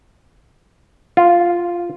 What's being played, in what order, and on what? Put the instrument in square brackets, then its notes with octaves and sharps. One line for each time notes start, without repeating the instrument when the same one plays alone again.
[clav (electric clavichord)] F4